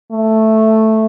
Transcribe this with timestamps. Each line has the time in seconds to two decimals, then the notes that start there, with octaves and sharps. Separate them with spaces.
0.11 A3